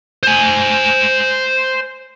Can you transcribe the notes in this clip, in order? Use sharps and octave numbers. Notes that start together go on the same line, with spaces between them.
C5 G#5